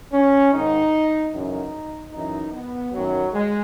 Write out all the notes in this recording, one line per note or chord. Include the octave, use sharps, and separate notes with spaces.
C#4
G#2 D#3 D#4
F#2 C#3 E3 D#4
F#2 E3 D#4
B3
F#2 D#3 F#3
G#3